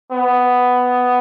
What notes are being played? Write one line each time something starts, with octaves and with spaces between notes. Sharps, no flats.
B3